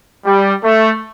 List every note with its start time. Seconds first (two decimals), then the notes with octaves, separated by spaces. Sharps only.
0.25 G3
0.63 A3